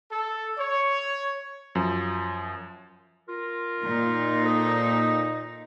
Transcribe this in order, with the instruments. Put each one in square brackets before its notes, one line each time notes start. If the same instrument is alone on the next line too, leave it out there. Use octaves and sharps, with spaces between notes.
[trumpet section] A4
C#5
[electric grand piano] F#2 F3
[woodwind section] F4 A#4
[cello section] A#2 D#4
[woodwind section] A4 C5 D#5